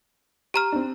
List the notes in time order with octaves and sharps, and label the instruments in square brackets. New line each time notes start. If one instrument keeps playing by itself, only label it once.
[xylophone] G4 A#5 F6
[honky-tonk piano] C4 D4